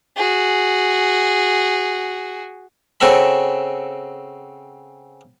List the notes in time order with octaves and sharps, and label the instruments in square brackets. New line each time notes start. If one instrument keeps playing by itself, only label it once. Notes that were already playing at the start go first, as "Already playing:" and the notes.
[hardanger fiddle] F#4 G#4
[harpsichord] C#3 C4 F#4 A4 E5 B5